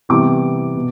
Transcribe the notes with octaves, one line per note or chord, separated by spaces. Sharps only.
C3 E3 G3 B3 D6
B2